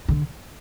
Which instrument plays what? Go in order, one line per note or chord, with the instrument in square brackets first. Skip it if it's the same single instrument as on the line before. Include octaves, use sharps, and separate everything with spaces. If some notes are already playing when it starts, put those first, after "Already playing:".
[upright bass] D3